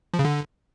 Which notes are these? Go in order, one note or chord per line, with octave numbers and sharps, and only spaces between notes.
F3
C#3
D3